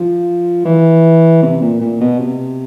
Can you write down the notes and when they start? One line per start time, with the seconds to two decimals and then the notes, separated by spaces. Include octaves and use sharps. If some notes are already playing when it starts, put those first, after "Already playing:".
Already playing: F3
0.65 E3
1.42 C3
1.61 A#2
1.81 A#2
2.00 B2
2.19 C3